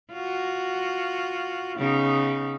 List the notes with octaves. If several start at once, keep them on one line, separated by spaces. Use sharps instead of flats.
F4 F#4
C#3 B3 D#4